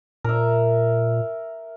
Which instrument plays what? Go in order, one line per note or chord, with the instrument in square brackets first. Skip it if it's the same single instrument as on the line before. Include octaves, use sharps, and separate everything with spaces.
[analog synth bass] A#2 [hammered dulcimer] A#4 E5